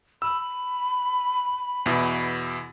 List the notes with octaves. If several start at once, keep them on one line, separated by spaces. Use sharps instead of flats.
B5 E6
E2 B2 E4